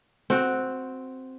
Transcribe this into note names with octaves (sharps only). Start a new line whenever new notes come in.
C4 F#4